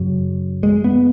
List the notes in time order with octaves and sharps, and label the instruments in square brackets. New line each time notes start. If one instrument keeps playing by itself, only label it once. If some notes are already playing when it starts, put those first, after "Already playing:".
Already playing: [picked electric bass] F#2 C#3 F#3
G#3
B3